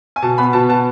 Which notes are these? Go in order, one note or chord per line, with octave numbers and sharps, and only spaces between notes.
G#5
B2 A5
B3 B5
B2 A5
B3 A5